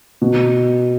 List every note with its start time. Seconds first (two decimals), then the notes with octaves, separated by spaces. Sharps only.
0.22 B2